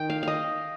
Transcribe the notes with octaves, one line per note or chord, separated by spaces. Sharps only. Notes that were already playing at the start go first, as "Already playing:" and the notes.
Already playing: D#3 G5
F5
D#5 F5